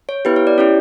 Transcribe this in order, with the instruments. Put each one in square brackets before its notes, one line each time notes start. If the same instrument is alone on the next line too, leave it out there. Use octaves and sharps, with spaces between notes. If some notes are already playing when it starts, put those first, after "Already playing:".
[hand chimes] C#5
B3 E4 G4 B4
C#5
D5
C#4 E4 G4 C#5